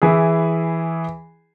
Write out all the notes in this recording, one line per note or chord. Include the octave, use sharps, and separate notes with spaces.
E3 E4 G#4